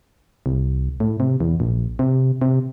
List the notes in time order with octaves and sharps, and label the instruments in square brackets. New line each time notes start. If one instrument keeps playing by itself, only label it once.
[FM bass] C2
A2
C3
E2
A#1
C3
C3